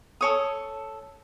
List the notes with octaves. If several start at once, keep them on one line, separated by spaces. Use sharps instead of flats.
A4 C#5 D#6